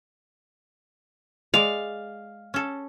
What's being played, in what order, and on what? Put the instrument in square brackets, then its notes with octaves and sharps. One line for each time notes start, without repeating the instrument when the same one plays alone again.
[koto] G#3 D5 [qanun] F5
[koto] C#4 A4